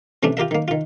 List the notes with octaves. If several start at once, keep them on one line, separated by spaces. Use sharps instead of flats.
C3 E3 A3 C#4 D4
F4 G4 A#4 E5
D#3 A#3
D#3 F4